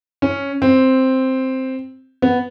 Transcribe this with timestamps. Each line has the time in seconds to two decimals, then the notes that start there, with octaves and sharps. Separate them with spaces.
0.22 C#4
0.62 C4
2.22 B3